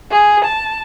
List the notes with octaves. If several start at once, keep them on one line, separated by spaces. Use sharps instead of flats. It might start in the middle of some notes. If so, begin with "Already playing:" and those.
G#4
A5